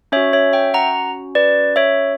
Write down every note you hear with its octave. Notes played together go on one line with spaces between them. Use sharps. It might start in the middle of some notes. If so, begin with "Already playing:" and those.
C#4 F#4 C#5 E5
C#5 E5
E5 G5
F#5 A#5
B4 D5
C#5 E5